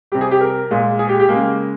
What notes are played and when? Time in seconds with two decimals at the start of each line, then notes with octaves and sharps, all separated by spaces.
0.12 G3 G4
0.14 C3
0.21 G#4
0.31 G4
0.41 A#4
0.71 A#2 G#3
0.99 G#4
1.09 G4
1.20 G4
1.29 C#3 G#3 A#3